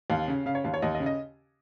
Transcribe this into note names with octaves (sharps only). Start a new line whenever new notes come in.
D#2 F5
C#3
C#3 F5
C#5
D#2 F5
C#5
D#2 D#5
D#5
C#3
D#5